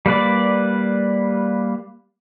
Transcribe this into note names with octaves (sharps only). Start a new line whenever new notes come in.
G3 A#3 B4 D5